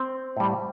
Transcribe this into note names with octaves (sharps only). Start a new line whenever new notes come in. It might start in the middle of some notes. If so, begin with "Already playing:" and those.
Already playing: C4
A2 G3